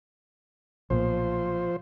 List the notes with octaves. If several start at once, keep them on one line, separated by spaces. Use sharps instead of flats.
B1 A#2 F3 C5